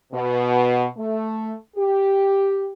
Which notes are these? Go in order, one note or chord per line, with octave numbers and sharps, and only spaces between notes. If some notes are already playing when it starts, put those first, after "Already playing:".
B2
A3
G4